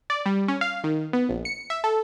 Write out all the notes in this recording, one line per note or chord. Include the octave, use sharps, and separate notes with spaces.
D5
G3
C#4
F5
D#3
B3
A#1
C#7
E5
A4